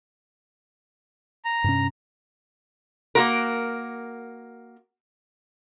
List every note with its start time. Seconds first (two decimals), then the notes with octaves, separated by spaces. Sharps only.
1.45 A#5
1.64 G2 C3 C#4
3.15 A#3 F#4 A#4